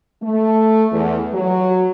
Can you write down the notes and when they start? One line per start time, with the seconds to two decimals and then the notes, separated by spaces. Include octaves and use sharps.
0.23 A3
0.93 E2
1.34 F#3